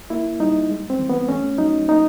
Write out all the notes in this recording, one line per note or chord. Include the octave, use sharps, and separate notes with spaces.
A#3 E4
G3 D#4
G#3
C4
E3
B3
A3 C#4
F#3 D#4
A#3 D#4